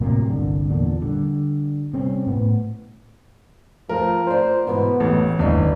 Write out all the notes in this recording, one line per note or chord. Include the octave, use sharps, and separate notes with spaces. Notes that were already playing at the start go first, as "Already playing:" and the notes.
A2 C3 F#3 A#3
G1 C2 D3
E2 A#2 D3
D3 G3
C3 G3 C4 C#4
A2 B3
F3 A3 A#4
F4 C5 D5
G#2 B2 E3 B3
A1 D#2 A3
G1 D#2 E3 D4 D#4 D5